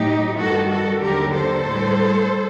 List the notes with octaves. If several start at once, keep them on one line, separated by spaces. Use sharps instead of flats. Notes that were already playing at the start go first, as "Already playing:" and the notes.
Already playing: A2 F#3 D#4 G4
G2 D#3 G3 F#4 A4
F#4 A4
D#2 D3 F#3 G4 A#4
A4 C5
A2 G3